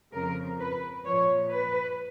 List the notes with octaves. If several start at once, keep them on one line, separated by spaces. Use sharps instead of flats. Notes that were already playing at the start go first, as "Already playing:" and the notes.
F2 C#3 F3 A#4
B4
A#2 F3 C#5
B4